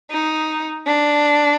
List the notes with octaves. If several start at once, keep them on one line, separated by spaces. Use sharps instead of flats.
D#4
D4